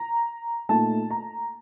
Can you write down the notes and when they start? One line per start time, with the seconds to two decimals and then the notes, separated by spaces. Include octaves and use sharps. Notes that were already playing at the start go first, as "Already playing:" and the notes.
Already playing: A#5
0.69 A#2 A3 D#4 A5
1.11 A#5